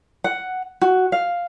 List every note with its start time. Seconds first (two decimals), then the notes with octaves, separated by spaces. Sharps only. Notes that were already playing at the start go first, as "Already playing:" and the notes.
0.24 F#5
0.81 F#4
1.12 F5